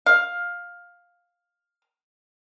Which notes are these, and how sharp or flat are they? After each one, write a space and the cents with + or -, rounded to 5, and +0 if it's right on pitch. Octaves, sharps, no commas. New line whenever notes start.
F5 +10